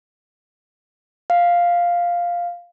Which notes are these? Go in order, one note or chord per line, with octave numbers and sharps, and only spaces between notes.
F5